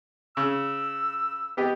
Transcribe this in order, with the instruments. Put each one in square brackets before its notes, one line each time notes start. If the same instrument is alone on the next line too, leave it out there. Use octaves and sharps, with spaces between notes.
[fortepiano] C#3 [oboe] E6
[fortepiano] B3 G4 D#5